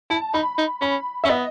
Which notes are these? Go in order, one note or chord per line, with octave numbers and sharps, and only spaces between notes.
E4 A5
D#4 B5
D#4
C#4 B5
C#4 E5
B3 D#5